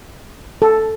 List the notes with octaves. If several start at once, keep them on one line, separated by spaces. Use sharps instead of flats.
A4